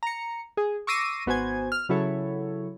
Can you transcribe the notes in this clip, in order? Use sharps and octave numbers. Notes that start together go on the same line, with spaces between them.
A#5 C#7
G#4
C#6 D6 E6 A#6 C7 D#7
G#1 B3 F#4 C5 G#5 G#6
F6
C#3 F#3 E4 A4 C#5